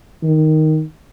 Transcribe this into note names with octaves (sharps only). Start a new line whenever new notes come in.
D#3